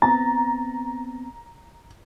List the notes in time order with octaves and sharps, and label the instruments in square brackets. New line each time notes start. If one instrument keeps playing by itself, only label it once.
[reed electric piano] B3 C4 A6 [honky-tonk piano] A#5